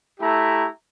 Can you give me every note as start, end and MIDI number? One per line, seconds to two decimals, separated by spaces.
0.20 0.66 57
0.20 0.66 64
0.20 0.66 67
0.20 0.66 82